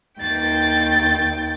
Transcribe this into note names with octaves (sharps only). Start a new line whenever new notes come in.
D#2 G5 A6